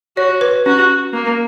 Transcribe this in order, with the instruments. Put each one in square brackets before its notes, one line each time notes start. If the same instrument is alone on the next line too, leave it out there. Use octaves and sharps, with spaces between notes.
[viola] F#4 [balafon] C#5
[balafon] B4
[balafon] C#4 [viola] F#4
[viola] A#3